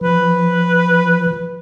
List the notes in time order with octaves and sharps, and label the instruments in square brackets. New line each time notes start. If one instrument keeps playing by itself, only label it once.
[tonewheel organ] F3 [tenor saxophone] B4